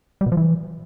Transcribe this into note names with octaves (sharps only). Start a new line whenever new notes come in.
G3
B2
F3
E3